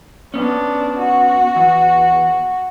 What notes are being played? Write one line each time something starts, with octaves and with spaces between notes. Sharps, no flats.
B3 C#4 D4
F#4
E2